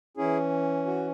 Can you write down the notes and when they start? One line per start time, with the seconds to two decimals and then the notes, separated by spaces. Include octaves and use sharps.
0.17 E3 C#4 E4 G#4
0.86 F#4